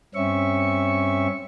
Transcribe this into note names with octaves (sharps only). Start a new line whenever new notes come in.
G2 C4 C#4 E5 C#6